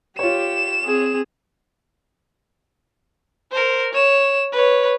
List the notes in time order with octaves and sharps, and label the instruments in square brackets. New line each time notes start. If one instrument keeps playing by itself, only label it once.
[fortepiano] F4 C#5 [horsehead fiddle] G4 [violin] E7
[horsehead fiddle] C4 G#4
[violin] A#4 C5
C#5 E7
B4 C#5